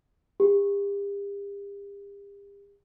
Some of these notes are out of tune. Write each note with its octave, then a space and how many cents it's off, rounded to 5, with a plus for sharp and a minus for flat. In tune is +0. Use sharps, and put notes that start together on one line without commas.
G4 +40